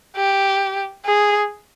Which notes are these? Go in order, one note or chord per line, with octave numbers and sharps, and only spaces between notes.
G4
G#4